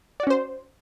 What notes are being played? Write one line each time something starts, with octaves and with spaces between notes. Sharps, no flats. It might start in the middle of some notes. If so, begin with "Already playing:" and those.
C#4 F#4 C5 D5